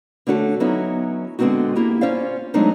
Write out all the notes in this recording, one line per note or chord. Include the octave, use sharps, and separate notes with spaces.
D3 A3 C#4 F#4 G#4 A4
F#3 B3 C#4 D#4 E4
D3 G#3 B3 C4 D#4 F#4
A#3 E4 G4
C#4 F4 C5 D5 F5
F#3 G#3 A3 C4 D4 D#4